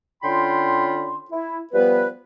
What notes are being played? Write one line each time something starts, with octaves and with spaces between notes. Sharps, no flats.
D3 C#4 F4 G5 B5 C6
E4
F3 G3 B3 B4